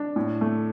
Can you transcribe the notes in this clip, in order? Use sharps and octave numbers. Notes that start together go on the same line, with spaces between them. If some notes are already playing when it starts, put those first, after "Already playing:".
Already playing: D4
A2
A3